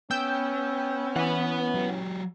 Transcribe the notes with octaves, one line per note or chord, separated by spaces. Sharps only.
B3 C#4 G5 E6 G6
E3 B4 F#5
F#3 G4